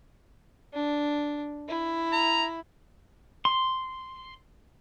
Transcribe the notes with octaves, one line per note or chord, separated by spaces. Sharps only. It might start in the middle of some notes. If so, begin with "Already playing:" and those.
D4
E4
A#5
C6